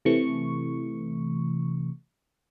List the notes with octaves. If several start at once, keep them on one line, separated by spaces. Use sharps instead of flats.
C3 E3 A3 C#6